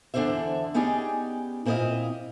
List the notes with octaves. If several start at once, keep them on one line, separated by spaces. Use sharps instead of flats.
E2 D3 D4 F#4 C5 E5
B3 C#4 D#4 G4 G#4 D5
A#2 C4 E4 A4 D#5 F5